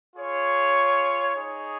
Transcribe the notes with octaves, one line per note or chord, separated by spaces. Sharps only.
F4 G#4 C#5
D#4 G#4 C#5